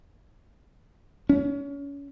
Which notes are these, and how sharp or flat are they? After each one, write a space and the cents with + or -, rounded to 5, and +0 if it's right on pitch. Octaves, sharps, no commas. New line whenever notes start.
C#4 +30